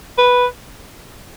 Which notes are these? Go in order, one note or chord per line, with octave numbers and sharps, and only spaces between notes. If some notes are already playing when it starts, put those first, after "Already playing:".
B4